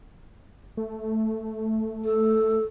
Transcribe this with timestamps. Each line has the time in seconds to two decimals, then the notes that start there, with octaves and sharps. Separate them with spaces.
0.77 A3
2.04 A4